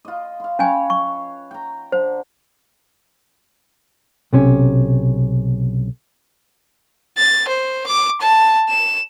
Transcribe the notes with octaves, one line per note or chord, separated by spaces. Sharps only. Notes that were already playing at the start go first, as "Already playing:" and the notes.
F4 D#5
F5 C6
C#4 B4 C#5 F5 G#5
C#6
G5 A#5
D3 C5
B1 C3 C#4
A6
C5
D6
A5
E7